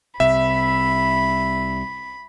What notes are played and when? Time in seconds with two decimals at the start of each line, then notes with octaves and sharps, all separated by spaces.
0.20 C2 C3 E5 B5